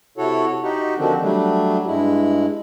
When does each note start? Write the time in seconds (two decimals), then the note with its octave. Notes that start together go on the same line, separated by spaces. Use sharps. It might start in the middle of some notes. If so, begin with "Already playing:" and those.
0.18 C3 E4 F#4 A4 C#5
0.63 D#4 F#4 G4
0.97 D3 D#3 F3 C4 D4 F#4
1.21 F#3 G3 A3 D4
1.86 G2 G#3 E4